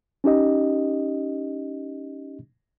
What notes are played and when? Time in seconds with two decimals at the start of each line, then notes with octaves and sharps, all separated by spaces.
0.24 C#4 D#4 G4 D#5